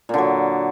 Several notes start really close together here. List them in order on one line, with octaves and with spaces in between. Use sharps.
A#2 D3 F#3